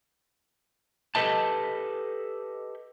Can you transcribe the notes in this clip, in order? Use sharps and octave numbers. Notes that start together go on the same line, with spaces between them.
G4 A4 B4 D#5 A5